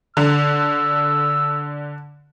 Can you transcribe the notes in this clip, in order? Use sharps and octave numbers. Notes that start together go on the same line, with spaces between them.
D3 E6